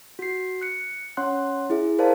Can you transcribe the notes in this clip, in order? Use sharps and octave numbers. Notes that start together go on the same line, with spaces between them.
F#4 C7
F#6 C#7
C#4 C#5 F#5 C6 F#6
E4 G#4 E5
A#4 C5 D5 F5 A5